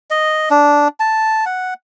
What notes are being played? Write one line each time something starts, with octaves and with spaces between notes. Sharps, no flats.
D#5
D4
A5
F#5